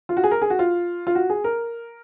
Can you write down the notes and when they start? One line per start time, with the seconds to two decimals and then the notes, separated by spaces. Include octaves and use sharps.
0.09 F4
0.17 F#4
0.24 G#4
0.31 A#4
0.42 G#4
0.50 F#4
0.59 F4
1.07 F4
1.15 F#4
1.30 G#4
1.44 A#4